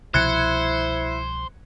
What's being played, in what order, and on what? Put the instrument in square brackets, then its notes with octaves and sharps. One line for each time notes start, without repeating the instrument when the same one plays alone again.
[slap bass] C2 B2 F3 [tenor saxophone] E4 [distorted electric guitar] C5 [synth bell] F#6 G#6 C#7